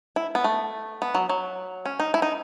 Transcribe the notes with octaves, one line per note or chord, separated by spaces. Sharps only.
E4
B3
A3
B3
F#3
F#3
C#4
D#4
E4
D#4